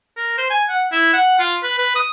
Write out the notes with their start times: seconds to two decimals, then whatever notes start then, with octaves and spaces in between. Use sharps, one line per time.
0.17 A#4
0.38 C5
0.51 G#5
0.69 F#5
0.92 E4
1.14 F#5
1.39 F4
1.63 B4
1.79 B4
1.96 D#6